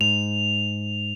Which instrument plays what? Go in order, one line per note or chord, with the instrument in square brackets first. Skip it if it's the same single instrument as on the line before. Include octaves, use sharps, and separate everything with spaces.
[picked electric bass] G#2 [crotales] F7